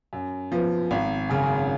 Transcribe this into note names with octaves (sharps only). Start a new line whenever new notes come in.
F#2
F3 B3
G#1
F#2 C#3